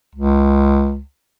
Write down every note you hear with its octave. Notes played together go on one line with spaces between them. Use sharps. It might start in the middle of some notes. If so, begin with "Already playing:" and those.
C#2